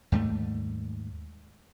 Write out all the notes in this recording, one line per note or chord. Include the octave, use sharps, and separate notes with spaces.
D#2 G#2 G3 A3